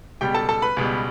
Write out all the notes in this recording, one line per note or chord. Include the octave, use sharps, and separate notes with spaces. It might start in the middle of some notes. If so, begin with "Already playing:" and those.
C#2 B2 G3 G4 G5
A4 A5
A4 A5
B4 B5
C#2 B2 G3